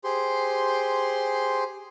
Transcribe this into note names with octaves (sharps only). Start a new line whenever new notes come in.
G4 G#4 C5 C6